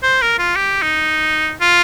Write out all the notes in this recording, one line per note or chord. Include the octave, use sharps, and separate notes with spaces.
C5
A#4
F4
G4
D#4
F4